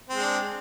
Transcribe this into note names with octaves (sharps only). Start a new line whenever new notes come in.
G#3 C4 D4